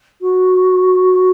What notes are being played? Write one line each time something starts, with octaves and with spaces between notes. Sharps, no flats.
F#4